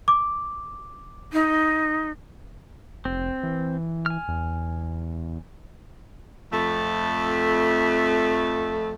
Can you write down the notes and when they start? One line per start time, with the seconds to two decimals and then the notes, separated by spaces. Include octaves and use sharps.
0.08 D6
1.33 D#4
3.05 F1 C4
3.43 E3
4.06 G#5 F6
4.28 E2
6.51 F2 A3